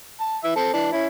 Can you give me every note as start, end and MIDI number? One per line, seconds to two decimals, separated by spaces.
0.20 0.37 81
0.44 0.51 52
0.44 0.51 76
0.44 0.51 88
0.56 0.74 60
0.56 0.74 69
0.56 0.74 81
0.74 0.90 52
0.74 0.90 74
0.74 0.90 81
0.93 1.07 61
0.93 1.07 64